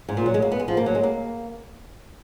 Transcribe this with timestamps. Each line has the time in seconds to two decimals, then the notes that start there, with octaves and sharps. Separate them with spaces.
0.09 G#2
0.17 A#2
0.26 F#3
0.34 G#3
0.42 A#3
0.52 B3
0.59 G#3
0.68 F3
0.77 A#3
0.86 F#3
0.95 G#3
1.03 A#3